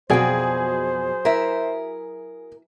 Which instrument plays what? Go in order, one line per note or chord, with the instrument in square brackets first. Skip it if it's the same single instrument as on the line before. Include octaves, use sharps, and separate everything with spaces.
[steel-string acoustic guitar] F2 B2 [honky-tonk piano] F#3 G#4 [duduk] C5 [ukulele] D5 G5
[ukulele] E4 E5 [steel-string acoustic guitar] A#4